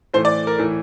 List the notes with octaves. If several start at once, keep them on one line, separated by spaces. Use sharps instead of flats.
A2 E3 A3 C5
D5
A#4
A2 E3 A3